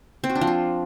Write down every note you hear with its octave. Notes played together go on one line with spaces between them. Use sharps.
C4
F#4
D4
F3
F4